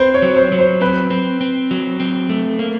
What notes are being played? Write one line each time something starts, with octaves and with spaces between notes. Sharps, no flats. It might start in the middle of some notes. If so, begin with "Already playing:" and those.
Already playing: C4 B4 C5
C#5
F#3
C5
F#3
C5
C4 B4
C4
C4
F#3
C4
A3
A#3